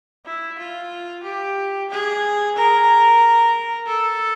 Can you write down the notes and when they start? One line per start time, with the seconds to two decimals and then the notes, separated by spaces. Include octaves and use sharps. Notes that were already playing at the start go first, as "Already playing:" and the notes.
0.26 E4
0.58 F4
1.24 G4
1.90 G#4
2.56 A#4
3.87 A4